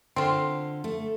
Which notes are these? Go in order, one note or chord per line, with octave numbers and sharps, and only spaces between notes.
D3 C4 F4
A3